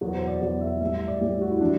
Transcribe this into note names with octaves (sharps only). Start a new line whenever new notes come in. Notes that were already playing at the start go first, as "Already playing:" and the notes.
E2 B2 F#3 F#4
C5
D5
E2 B2 F#3 D5
E5
A2 G3 E5
E5
D5
A2 G3 G4
F#4
E4
E3 G3 D4